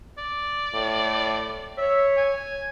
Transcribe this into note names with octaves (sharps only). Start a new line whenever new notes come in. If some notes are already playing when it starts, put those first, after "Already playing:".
D5
A2
C#5 E5
G#5